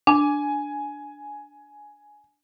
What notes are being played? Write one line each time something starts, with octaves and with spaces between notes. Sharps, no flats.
D4 G#5